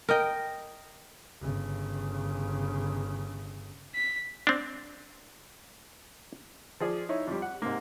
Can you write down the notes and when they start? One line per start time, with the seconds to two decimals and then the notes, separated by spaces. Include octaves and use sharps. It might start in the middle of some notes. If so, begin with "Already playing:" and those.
0.09 A#4 D#5 G5
1.40 G1 C#3
3.95 B6
4.47 C4 D4
6.81 F3 G#4 D5
7.09 D#4 E4 C#5
7.27 F2 G3
7.42 F#5
7.62 G#2 C3 A#3